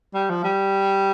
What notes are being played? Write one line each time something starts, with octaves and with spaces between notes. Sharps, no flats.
G3
F3
G3